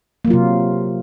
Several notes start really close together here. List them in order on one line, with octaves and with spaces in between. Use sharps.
A#3 F#3 F4 C3